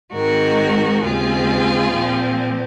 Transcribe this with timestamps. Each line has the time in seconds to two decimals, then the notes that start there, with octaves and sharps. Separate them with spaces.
0.13 G#2 D#3 G#3 C4 F#4 A#4
1.03 D#2 C#3 G#3 C4 F4 G#4
1.93 A#2 F3 C4